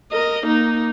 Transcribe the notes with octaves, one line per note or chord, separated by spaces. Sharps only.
A#4 D#5
A#3 D#4